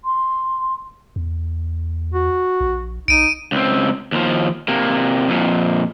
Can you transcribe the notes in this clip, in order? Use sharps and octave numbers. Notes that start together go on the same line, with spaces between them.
C6
E2
F#4
A#1
B1 D#4 D7 D#7
C#2 C4
D#2 F3
C3 A#3
F2 A#2